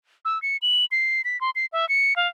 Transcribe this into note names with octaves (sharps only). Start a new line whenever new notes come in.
E6
C#7
F#7
C7
B6
C6
C7
E5
C#7
F5